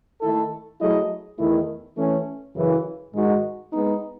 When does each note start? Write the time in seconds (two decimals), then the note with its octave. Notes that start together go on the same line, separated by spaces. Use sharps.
0.21 D#3 A3 E4 A4
0.80 F#3 A3 E4 G#4 D#5
1.38 E2 D#3 A3 E4
1.97 E3 A3 C#4
2.55 F#2 C#3 E3
3.14 G#2 D#3 G#3 D#4 F#4
3.72 G#3 B3 D#4